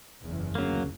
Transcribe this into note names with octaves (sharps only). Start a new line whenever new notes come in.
F#1 E2
D2 C#3 F#3 A#3